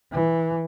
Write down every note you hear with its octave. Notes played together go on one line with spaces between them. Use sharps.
E3